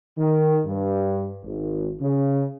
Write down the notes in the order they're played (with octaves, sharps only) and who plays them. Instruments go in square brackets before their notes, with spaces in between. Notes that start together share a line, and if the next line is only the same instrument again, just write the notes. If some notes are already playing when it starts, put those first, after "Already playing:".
[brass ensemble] D#3
G2
G#1
C#3